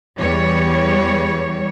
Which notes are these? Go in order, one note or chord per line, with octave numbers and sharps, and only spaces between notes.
E2 G3 C#5